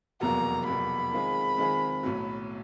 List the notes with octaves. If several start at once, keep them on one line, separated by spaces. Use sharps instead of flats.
F1 E2 B2 F#3 A#3 A#5
F1 E2 B2 F#3 A#3 B5
D#3 G#3 C4 F4 G#4
D#3 G#3 C4 F4 G#4
B1 A2 F#3